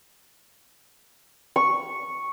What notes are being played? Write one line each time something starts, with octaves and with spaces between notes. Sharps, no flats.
C#6